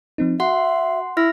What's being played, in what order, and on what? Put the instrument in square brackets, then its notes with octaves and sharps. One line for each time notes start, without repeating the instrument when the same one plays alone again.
[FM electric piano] F3 C4 D#4
[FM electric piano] F#4 [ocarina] E5 [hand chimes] F#5 C6
[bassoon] E4 [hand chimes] F6 A#6